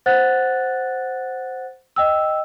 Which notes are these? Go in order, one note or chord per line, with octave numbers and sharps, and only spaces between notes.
C5 F#5 F#6 A6
D#5 G5 E6